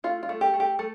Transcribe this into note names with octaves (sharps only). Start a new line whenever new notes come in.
A3 F4
F4
A3
G4
A3
G4
A3 A4